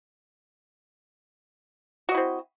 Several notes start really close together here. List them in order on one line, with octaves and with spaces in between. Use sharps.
F#4 D#5 E4 C4